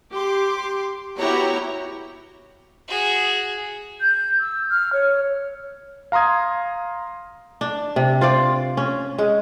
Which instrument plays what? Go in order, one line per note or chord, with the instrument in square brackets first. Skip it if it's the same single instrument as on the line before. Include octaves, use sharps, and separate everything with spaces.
[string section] G4 C6 D6
B3 E4 F#4 G4 C#5 A#5
[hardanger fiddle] F#4 G#4
[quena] G6
E6
F6
C#5
[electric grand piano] F5 A#5 C6 D#6 G#6
[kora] D4
C3
F4 C5 D5
C#4
G#3